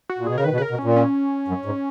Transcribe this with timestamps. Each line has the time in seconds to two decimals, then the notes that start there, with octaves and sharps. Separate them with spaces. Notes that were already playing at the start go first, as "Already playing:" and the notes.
0.09 F#4
0.18 A#2
0.27 B2 G#4
0.36 C#3 A#4
0.44 D#3 B4
0.51 B2
0.57 C#3 B4
0.62 A#4
0.70 B2
0.79 A#2 C#4
0.96 C#4
1.48 F#2
1.65 G#2